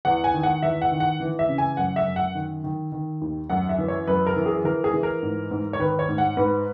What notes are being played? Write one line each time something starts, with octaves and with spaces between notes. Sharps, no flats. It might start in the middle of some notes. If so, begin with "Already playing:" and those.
E2 F#5
G#5
D#3
F#5
E2 E5
F#5
D#3
F#5
E3
E5
C#3
G#5
F#2 F#5
E5
F#2
F#5
D#3
D#3
D#3
D#2
F#2 F#5
E5
E3
C#5
F#2 B4
A#4
E3
G#4
E3 A#4
G#4
E3
A#4
G#2
G#2
C#5
D#3 B4
C#5
G#2
F#5
G#2 B4